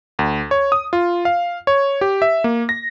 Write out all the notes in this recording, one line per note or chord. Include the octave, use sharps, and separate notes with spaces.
D2
C#5
D#6
F4
F5
C#5
G4
E5
A#3
A#6